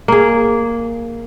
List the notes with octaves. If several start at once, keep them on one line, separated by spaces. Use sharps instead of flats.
A#3 G#4